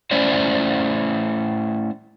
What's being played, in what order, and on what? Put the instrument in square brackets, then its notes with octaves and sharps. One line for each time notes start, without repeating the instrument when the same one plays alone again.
[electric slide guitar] A3 C#4 E4 C5 D5